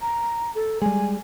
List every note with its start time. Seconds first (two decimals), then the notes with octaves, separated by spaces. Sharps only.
0.01 A#5
0.55 A4
0.82 G3 G#3 G#5